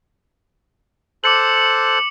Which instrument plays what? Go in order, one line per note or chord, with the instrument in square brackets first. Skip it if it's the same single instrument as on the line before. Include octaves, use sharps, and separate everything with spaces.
[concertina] A4 C5 F#6 [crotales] D6 C#7 F#7